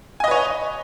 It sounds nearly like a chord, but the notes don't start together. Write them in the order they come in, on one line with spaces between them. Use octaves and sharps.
G#5 D#5 B4 C#5